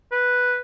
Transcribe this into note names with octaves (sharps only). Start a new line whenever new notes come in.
B4